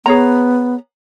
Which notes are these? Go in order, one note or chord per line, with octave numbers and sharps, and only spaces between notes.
B3 G#4 C#5 A#5